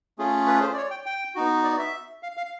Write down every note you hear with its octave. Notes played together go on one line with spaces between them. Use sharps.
A3 C#4 F4 G#4
B4
C5
D5
C#5
G5
G5
B3 D#4 F#4
D5
E5
F5
F5